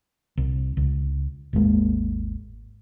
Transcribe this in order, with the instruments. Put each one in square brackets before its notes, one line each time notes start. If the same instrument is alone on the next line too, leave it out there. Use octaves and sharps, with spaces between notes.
[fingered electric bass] C2
C#2
G#1 D#2 G#3 A#3